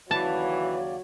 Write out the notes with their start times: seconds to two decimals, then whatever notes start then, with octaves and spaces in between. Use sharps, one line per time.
0.11 D#2 C#3 E3 F#3 D5 A5